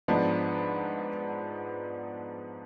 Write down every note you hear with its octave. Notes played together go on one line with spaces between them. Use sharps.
G#2 F3 G#3 B3 D4